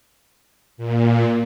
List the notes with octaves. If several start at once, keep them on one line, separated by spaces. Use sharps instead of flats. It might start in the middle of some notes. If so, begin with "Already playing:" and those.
A#2